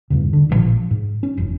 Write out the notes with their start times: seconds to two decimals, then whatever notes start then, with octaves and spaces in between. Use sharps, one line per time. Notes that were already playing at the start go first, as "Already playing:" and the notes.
0.10 E2 G2 C#3
0.33 D3
0.49 A1 G2 A#2 F3
0.91 G#2
1.23 C#4
1.38 F#1 E2